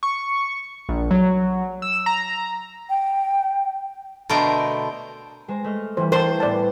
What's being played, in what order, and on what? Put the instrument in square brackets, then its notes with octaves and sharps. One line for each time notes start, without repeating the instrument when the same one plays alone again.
[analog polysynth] C#6
A#1
F#3
E6
A#5
[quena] G5
[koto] B2 D3 A3 A#4 C5 G5
[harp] G#3 C5 A#5
A3 D#5 F6
[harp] E3 G3 [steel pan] C5
[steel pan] A#4 A5 [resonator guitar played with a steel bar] C5
[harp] A2 B3 [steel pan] D5 A5